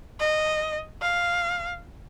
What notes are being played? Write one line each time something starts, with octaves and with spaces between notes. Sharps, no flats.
D#5
F5